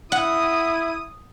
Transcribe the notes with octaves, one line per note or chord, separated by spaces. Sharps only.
E4 F#5 D#6